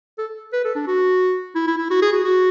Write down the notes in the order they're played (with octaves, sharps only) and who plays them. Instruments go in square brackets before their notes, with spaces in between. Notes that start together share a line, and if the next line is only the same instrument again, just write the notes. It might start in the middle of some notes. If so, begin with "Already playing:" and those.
[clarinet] A4
B4
A4
D4
F#4
E4
E4
E4
F#4
G#4
F#4
F#4